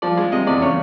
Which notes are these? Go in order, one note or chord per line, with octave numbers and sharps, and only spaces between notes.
F3 D5
G#3
C3 D#5
E2 D5
C#3 C#5